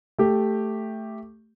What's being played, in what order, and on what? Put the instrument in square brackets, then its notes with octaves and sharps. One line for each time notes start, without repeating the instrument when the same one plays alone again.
[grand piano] A3 G4